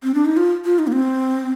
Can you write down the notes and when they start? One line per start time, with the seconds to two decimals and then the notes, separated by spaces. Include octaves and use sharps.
0.03 C4
0.14 D4
0.25 D#4
0.37 F4
0.65 F4
0.79 D#4
0.87 A#3
0.92 C4